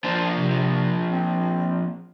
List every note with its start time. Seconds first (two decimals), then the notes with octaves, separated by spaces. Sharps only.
0.04 F3 A#3 D4 C5
0.33 C3
1.08 C4